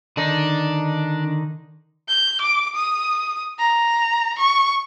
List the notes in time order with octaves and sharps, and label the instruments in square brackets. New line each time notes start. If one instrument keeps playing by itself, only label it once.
[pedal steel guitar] D3 D#3 D#4 [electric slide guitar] D4
[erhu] G6
D6
D#6
A#5
C#6